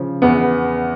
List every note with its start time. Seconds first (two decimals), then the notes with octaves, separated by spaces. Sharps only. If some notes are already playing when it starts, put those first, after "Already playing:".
Already playing: C#3 F3
0.22 E2 B3